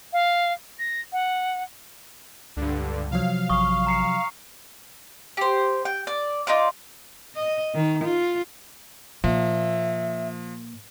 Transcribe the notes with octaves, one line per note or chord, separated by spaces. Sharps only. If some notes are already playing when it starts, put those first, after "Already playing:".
F5
A#6
F#5
C#2 G2 D3
C3 F3 F#3 F5
A1 C#6 D#6
A#5 C7 C#7
G4 C5
G5
D5
D#4 F4 D5 D6
D#5
D#3
F4
A#2 F3 E5